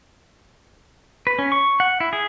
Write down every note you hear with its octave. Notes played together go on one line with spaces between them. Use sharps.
B4
C#4
C#6
F#5
E4
G#4